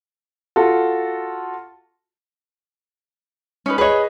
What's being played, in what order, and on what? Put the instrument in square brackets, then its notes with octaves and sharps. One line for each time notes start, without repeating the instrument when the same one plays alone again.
[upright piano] F4 F#4 A4
[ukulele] C#4 D#4 B4
[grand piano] G#4 D#5 [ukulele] B4 C#5